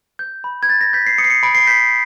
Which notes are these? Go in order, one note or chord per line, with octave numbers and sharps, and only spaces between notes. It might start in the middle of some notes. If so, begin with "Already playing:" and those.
G6
B5
G#6
G6 A6
A#6
G6 B6
C7
D#6 C#7
C7
C#7
B5 D7
C7
G6 B6